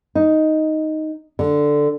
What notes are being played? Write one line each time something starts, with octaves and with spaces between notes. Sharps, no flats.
D#4
D3